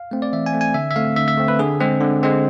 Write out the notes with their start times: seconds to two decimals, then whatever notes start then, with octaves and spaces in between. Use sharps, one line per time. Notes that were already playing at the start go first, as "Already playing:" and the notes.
Already playing: F5
0.11 A3 C4
0.22 D5
0.33 E3 E5
0.46 G#5
0.53 A3 C4
0.61 G#5
0.74 D3 E5
0.91 E5
0.96 A3 C4 F5
1.16 D3 E5
1.28 E5
1.37 A3 C4
1.48 B4
1.59 D3 G#4
1.81 G#3 C4
2.01 D3
2.23 G#3 C4